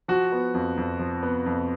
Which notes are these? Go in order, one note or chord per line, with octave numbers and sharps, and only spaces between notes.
F3 F#4
B3
F2
F2
F3
B3
F2